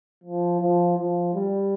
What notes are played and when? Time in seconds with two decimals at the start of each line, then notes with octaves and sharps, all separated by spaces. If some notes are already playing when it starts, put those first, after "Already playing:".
0.24 F3
0.60 F3
0.97 F3
1.34 G3